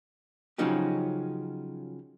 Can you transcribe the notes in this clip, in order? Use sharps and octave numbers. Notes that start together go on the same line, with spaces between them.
C#3 F3 F#3 C#4 D#4 G4